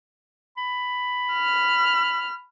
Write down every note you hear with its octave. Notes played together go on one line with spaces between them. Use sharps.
B5
F6